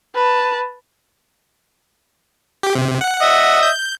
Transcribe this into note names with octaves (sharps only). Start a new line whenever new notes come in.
B4 A5
G4
C3
F#5
D#5 E5
G6